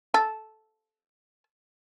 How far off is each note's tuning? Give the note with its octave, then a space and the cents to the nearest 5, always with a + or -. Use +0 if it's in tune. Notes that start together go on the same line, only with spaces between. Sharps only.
A4 -10